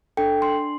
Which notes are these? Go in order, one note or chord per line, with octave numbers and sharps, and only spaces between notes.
D4 A4 G5
D4 C6